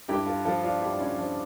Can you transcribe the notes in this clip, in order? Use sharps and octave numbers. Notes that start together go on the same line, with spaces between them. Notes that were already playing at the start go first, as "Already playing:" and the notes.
G2 E4 G4
F4 A4
F3 F4 A4
D4 F4
G2 E4 G4
D4
C#4 E4
F3 D4 F4